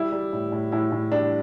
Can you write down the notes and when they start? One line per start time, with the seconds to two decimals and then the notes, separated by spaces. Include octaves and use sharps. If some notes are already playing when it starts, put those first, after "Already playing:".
Already playing: G3 E4
0.12 G3
0.33 A2
0.52 A2
0.72 A2 E4
0.92 A2
1.11 G3 D4